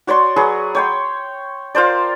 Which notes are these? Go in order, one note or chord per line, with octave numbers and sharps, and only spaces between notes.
F#4 C#5 D5 C6
F#3 G#4 B4
C#5 G5 C6
F4 A#4 C5 D5